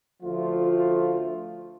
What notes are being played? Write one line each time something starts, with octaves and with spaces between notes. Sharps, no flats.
D2 F3 A3 F4